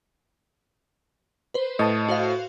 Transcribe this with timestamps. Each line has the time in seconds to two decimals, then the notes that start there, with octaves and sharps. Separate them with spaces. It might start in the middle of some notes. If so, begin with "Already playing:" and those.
1.54 B4 C5
1.79 A2 D#5 A5 D#6
2.08 F#4 C5 F5